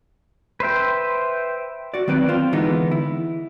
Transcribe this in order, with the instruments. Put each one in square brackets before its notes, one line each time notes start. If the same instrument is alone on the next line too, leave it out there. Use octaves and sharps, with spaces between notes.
[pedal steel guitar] B4 C5 E5 G5
[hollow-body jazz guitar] F#4 D5
D#3 F#3 C4 B4 D5
C4 F4 C5
D3 E3 G#3 B3 D#4
E4